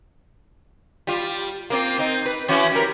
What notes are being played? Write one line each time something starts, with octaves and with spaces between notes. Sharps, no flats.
G3 F4
A#3 C4 F4
C4 D#4
B4
E3 C#4 F#4
G3 A#4